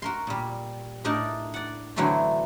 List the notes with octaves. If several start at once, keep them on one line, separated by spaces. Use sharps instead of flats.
F#4 A#4 C6
A#2 G3
A2 D4 D#4 A#4 D5 A5
D5 F#5
D3 E3 F#3 A3 C4 D4